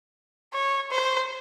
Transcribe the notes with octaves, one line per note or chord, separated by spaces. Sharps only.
C#5
C5